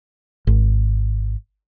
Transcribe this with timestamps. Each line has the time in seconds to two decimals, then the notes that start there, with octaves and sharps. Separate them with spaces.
0.47 G#1